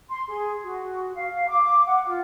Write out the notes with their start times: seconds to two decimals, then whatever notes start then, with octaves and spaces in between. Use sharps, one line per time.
0.10 C6
0.28 G#4
0.63 F#4
1.14 F5
1.48 D6
1.86 F#5
2.08 F4